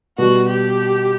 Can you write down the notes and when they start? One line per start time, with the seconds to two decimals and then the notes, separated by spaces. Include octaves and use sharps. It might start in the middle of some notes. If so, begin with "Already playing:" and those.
0.18 B2 G3 B3 F#4
0.48 G4